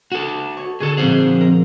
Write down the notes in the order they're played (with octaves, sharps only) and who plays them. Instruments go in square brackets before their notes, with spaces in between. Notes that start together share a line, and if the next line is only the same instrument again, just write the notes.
[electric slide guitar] F#4 A4
[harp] C#5
[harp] D3 F#4 E7 [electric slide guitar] G#4 A4
[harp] A#2 F3 F#5 [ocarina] C4 [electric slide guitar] G#4 C5
[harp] A#4